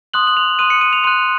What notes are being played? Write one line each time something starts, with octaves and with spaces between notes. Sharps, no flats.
C6 D#6 F#6 F#7
F#7
F7
C6 D#6 F#6 D#7
C#7
D#7
F7
C6 F#6 D#7